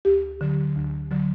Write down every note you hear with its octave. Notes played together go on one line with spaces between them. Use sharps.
D2 G4
D3 F#3
D2
D3 F#3